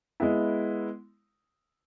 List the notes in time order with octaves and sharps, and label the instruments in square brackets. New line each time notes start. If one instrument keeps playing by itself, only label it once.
[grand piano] G#3 B3 E4